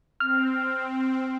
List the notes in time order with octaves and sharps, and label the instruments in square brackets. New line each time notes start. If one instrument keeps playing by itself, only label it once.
[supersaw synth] C4 [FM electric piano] F6